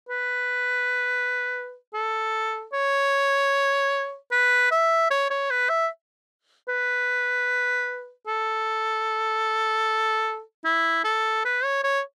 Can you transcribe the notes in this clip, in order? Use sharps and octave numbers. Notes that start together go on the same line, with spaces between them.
B4
A4
C#5
B4
E5
C#5
C#5
B4
E5
B4
A4
E4
A4
B4
C#5
C#5